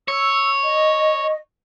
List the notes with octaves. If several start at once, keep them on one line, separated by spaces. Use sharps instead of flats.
C#5 E6
D#5